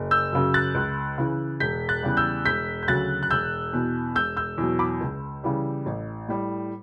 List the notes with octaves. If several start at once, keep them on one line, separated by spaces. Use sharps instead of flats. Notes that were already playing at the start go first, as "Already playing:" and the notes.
Already playing: F#1
E6 G6
F#2 C#3 F#3
F#6 A6
C#2
C#3 E3
E1 G6 B6
F#6 A6
E2 C#3 G3
E6 G6
E1 G6 B6
G6
D2 C#3 F#3 F#6 A6
F#6
E1 E6 G6
E2 B2
E1 E6 G6
E6 G6
E2 B2 F#3
B5 D6
C#2
C#3 E3 G3
A1
A2 G3